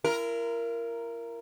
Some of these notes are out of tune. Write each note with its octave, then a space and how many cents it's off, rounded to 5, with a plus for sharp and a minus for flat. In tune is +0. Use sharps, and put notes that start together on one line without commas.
E4 +45 A#4 +0